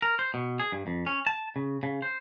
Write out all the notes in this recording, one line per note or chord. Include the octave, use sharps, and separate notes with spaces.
A#4
C5
B2
G#4
G2
F2
C#4
A5
C#3
C#3
C5